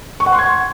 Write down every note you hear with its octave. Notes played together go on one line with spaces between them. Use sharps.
C#6
F#5
C6
G#6